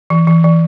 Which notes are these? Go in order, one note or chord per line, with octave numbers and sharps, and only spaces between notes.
E3
E3
E3